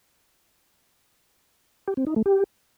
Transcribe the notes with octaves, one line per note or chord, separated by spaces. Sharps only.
G4
C4
D#4
A3
G4